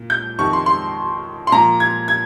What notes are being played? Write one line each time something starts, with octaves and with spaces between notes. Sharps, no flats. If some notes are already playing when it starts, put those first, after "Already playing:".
Already playing: A#2
G6
F2 C3 D#3 C#6
C6
C6
C6
A#2 F3 A#5
G#6
G#6